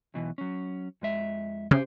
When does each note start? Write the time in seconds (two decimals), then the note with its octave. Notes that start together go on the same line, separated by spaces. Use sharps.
0.14 B1 B2 E3
0.38 F#3 C#4
1.02 F2 G#3 E5
1.71 C#3 G4 C5